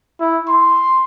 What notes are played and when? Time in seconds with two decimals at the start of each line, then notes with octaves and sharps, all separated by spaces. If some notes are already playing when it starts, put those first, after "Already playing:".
0.20 E4
0.48 C6